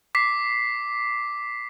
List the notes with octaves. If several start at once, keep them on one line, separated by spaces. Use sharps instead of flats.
D6 B6 C7